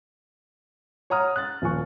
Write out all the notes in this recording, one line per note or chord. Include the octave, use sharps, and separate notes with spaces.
C#5 F#5 A#5 D#6 F6
F#6 A6
D#1 F3 G#5 C#6